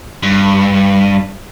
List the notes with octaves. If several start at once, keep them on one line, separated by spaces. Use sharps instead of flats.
G2